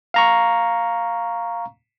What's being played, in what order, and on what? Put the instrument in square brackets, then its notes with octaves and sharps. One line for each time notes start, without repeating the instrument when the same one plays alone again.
[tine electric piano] F5 A#5 C#6